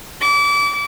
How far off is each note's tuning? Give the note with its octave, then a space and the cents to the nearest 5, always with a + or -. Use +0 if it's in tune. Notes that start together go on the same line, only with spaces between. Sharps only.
D6 -30